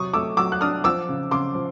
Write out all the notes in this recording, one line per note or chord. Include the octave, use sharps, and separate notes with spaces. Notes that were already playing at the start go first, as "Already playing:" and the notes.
Already playing: C3 F#3 C#6 D#6
A3 D6 E6
F#3 D6 E6
F#6
D4 D#6 F6
F3 D6 E6
C#3
C#3 C6 D6
F3